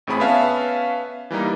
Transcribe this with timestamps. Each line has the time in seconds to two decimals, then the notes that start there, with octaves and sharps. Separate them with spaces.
0.07 A1 A2 C4 G#4 B5
0.20 B3 C#4 B4 E5 F5 A5
1.30 E3 G3 A#3 D#4